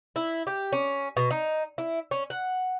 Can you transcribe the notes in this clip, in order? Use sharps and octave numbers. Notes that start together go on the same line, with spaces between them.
E4
G4
C#4
B2
D#4
E4
C#4
F#5